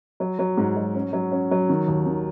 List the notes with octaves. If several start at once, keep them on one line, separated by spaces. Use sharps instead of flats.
F#3
F#3
G#2
F#3
C#4
F#3
C#4
F#3
D#3
D#2
D#3